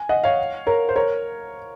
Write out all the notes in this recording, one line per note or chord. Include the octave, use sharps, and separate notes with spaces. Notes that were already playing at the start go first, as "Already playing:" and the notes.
Already playing: G#5
D#5 F#5
C#5 F5
A#4 C#5
C5
A#4 C#5